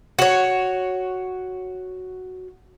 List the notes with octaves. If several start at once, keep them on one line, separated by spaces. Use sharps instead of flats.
F#4 C#5